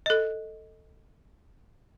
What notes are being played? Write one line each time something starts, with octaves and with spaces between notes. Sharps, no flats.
A4 D#5